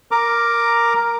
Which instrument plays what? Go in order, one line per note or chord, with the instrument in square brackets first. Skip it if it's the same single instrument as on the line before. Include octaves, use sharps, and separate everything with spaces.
[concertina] A#4 A#5 D6